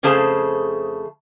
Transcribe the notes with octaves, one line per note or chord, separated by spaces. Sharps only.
F2 C#3 A3 G#4 C5 A5